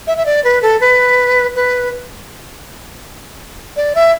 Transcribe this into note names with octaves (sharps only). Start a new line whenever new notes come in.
E5
E5
D5
B4
A4
B4
B4
D5
E5